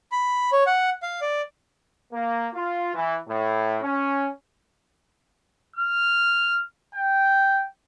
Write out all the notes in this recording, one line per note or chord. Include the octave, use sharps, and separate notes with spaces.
B5
C#5
F#5
F5
D5
A#3
F4
E3
A2
C#4
F6
G5